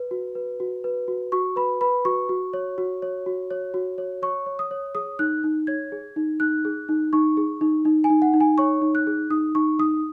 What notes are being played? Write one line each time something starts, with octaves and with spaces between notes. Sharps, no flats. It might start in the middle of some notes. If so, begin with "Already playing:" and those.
Already playing: B4
F#4
B4
F#4
B4
F#4
F#4 C#6
B4 B5
B4 B5
F#4 C#6
F#4
C#5
F#4
C#5
F#4
C#5
F#4
C#5
C#5 C#6
C#5
D#6
C#5
G#4 D#6
D#4 F#6
D#4
C#5 G#6
G#4
D#4
D#4 F#6
G#4
D#4
D#4 C#6
G#4
D#4
D#4
G#5
D#4
F#5
D#4
G#5
C#5 C#6
D#4
F#6
G#4
D#4 D#6
D#4 C#6
D#4 D#6